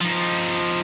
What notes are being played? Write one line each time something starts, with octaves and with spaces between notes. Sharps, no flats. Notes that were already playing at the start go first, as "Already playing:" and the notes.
F3 D#4